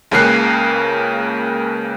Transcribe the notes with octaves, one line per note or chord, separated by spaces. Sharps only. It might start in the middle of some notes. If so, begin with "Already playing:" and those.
C#2 C#3 A#3 F#6 C7